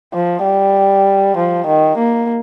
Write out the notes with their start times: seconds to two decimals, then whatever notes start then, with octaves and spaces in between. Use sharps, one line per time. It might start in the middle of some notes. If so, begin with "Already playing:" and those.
0.14 F3
0.44 G3
1.37 F3
1.67 D#3
1.98 A#3